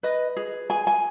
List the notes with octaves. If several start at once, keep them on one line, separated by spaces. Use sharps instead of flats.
B4 D#5
G#4
G#4 G#5
G#5